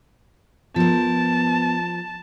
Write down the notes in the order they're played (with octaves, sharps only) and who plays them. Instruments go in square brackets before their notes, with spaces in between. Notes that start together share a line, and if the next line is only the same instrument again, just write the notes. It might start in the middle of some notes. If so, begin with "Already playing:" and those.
[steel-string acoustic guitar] F3 A#4 [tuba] B3 [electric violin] A5